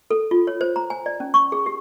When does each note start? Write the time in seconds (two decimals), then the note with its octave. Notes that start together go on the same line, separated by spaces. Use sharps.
0.11 A4
0.31 F4
0.47 C#5
0.61 C5
0.76 A#5
0.90 G#5
1.06 D5
1.20 C#4
1.34 C#6
1.52 G#4
1.66 G4